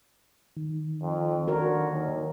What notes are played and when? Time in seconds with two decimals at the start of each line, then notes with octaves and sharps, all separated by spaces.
0.57 D#3
1.02 F2
1.48 D3 F#4 A#4 C#5
1.90 D#2